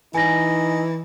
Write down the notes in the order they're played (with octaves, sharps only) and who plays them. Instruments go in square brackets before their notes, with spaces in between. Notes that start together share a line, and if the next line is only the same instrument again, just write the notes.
[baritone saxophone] E3 [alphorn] D#4 [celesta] G#5 A#6